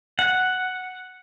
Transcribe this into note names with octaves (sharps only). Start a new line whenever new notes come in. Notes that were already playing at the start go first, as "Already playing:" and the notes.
F#5